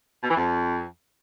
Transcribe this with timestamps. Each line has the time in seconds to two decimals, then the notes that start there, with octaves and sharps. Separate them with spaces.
0.23 B2
0.30 E3
0.37 F2